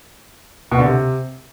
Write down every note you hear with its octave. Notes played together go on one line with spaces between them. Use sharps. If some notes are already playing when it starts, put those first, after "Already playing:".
B2
D3
C3